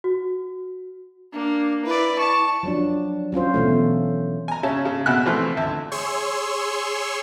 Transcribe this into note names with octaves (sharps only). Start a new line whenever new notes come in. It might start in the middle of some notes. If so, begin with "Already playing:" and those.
F#4
A#3 D4
E4 B4 D5
A5 C#6
F3 F#3 D4
F#3 C#4 F4 C5
B2 E3 A3
G#5 A#5
C#3 C#4 E5 A5
C#3
B2 E5 F#5 G#5 B5 F#6
E3 F3 A3 C4
D2 E5
G#4 C#5 C6 C#6 E6